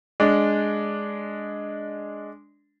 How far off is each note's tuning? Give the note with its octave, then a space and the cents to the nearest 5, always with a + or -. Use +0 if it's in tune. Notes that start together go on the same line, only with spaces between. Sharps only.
G#3 +0 D4 -5